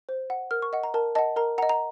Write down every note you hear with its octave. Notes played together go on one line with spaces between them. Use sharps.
C5
F#5
A#4 F6
C#6
D#5 F#5
A#5
A#4 A5
D#5 F#5 A5
A#4 A#5
D#5 F#5 A#5
A#5